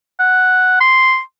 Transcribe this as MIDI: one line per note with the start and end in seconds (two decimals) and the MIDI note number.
0.20 0.77 78
0.80 1.20 84